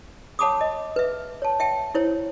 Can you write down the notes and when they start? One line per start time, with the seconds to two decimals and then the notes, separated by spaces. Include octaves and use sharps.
0.39 C#5 F#5 A5 B5 D6 D#6
0.61 D#5
0.96 B4 E5
1.42 C#5 A5
1.60 E5 G5 A5
1.95 E4 C5 C#5